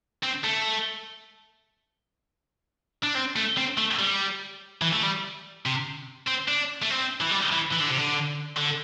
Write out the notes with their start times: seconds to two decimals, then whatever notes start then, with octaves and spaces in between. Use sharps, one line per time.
0.24 C4
0.44 A3
3.03 D4
3.15 C4
3.36 A3
3.58 C4
3.78 A3
3.99 G3
4.82 E3
4.93 A3
5.03 G3
5.66 C3
6.28 C4
6.48 D4
6.82 A3
6.90 C4
7.21 E3
7.32 G3
7.53 E3
7.73 E3
7.81 D3
7.90 C3
7.98 D3
8.57 D3